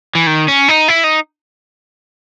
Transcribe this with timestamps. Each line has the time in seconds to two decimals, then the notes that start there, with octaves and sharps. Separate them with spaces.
0.15 E3
0.27 D#3
0.48 C#4
0.68 D#4
0.88 E4
1.04 D#4